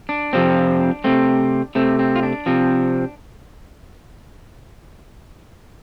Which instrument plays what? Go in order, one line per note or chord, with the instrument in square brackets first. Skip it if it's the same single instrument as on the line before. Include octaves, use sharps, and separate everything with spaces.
[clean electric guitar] D4
F2 C3 F3 C4
C3 A3 C4
C3 A3 C4
C4
F4
D4
C3 F3 C4